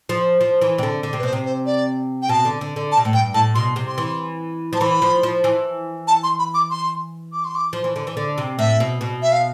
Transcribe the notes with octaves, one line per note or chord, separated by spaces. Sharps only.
F3
F3
E3
C3
D3
D3
C3
B4
B2 C5
C3
C5
D5
G5
B2 A5
D3
D3
D3
A5
B2
A2
G2 G5
A2 A5
B2 C6
C3
C6
E3
F3 A5
E3 B5
F3
F3
E3
A5
C6
B5
D6
C6
D6
C6
D6
F3
E3
D3
E3
D3
C3
A2 E5
B2
B2
E5
F5